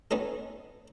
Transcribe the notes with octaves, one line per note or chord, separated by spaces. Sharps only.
B3 C#4 D#4 A4